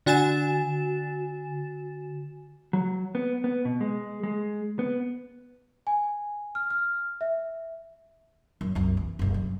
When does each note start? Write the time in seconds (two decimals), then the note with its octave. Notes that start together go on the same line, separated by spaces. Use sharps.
0.06 D3 F#4 G#5 A6 E7
2.73 F#3
3.15 B3
3.44 B3
3.65 B2
3.81 G#3
4.23 G#3
4.79 B3
5.87 G#5
6.55 F6
6.70 F6
7.21 E5
8.61 F#2
8.75 C2 F#2
8.97 E3
9.19 F#1 C2
9.34 F#2